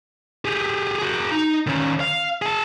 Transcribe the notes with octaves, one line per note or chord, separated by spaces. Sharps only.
G4 G#4
F#4 G#4
D#4
D#3 C#4
F5
G#4 A5